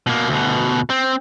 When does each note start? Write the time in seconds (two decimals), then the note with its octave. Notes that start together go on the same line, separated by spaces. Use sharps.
0.07 B2 A#3
0.29 D2 B2
0.90 C4